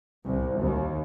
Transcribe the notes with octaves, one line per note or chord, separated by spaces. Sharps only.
C2
D#2